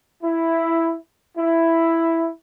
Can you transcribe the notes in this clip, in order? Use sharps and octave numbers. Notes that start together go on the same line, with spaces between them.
E4
E4